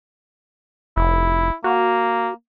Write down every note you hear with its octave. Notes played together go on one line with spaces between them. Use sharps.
F1 E4
A#3 F#4